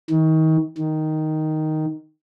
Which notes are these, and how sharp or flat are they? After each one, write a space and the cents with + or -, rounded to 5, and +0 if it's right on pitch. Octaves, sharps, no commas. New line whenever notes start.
D#3 +30
D#3 +0